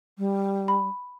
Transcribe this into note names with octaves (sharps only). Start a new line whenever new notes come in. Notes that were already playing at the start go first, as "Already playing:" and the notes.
G3
B5